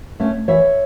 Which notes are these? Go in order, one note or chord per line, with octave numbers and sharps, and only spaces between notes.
A3 C#4
E3 C#5 E5